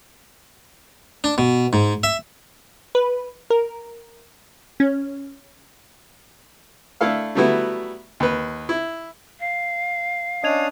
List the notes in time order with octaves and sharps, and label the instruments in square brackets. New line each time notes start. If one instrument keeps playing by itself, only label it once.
[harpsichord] D4
B2
G#2
E5
[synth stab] B4
A#4
C#4
[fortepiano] A3 D4 E4 A4 F5
F#3 G3 A3 B3 E4 F#4
D#2 B4
E4
[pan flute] F5
[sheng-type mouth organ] C#4 D4 D#6 [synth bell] D#5 G#6 F7